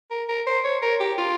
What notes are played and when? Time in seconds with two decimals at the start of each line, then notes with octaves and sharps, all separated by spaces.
0.11 A#4
0.29 A#4
0.47 C5
0.64 C#5
0.82 A#4
1.00 G4
1.18 F4